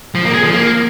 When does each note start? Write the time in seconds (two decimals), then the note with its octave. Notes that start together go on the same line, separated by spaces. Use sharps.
0.15 F3
0.25 A#3
0.34 G#4
0.44 F3
0.54 A#3